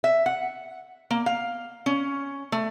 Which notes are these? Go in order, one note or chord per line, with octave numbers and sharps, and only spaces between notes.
E5
F#5
A#3
F5
C#4
A3